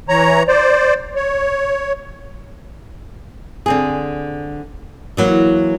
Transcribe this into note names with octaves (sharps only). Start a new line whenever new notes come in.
E3 C#5 A#5
C5 D5
C#5
D3 C4 G#4
E3 F#3 A#3